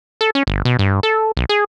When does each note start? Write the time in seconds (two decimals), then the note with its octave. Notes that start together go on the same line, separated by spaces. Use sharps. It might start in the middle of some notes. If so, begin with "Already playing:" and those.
0.21 A4
0.35 C#4
0.47 G1
0.65 B2
0.79 G2
1.03 A4
1.37 B1
1.49 G#4